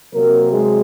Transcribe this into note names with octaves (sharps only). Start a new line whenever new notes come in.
C3 F#3 A#3 C4 A#4
G#3 G#4